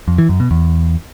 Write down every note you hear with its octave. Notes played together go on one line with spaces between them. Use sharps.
F2
E3
F#2
B2
E2